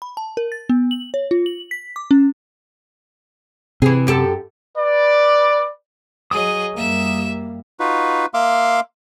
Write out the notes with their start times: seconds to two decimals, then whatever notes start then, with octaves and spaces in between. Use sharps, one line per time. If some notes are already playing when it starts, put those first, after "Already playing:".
0.02 B5
0.17 A5
0.37 A#4
0.52 A6
0.69 B3
0.91 F#7
1.14 C#5
1.31 F4
1.46 F#7
1.71 B6
1.96 D6
2.11 C#4
3.82 C3 E3 G#4
4.07 F#2 G4 A4
4.77 B4 D5
6.31 F#3 G#4 D#5 D#6
6.77 F#2 G3 A#3 E5 E7
7.80 D#4 F4 F#4 B4
8.34 A#3 E5 F5 C6 D6